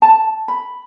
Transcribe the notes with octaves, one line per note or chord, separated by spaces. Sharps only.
A5
B5